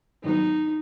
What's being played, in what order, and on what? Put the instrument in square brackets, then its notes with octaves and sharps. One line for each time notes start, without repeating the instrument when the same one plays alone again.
[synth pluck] G#2 D#3 F#3 B3 [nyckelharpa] D#4